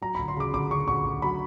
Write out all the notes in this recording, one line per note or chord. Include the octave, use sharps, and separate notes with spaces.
F#3 A#5
B5
D2
C6
C#3 D6
D2 D6
C#3 C#6
D2 C#6
D2
F#3 B5